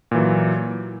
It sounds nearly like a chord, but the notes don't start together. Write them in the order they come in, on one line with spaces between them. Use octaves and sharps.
A#2 E3 F#3